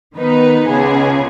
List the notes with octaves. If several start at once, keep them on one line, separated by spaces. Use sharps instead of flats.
D#3 B3 D#4 B4
C#2 C#3 B3 G#4